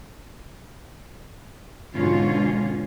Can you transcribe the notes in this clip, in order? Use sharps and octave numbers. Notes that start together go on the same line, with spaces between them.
G#2 B2 D3 E3 C#4 F4